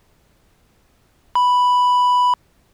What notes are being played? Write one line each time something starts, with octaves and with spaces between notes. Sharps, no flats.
B5